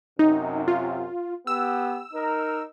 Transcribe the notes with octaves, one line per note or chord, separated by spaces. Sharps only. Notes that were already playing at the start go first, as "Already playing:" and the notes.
F#2 C3 D#4
F4
B3 G4 E6
D#4 A#4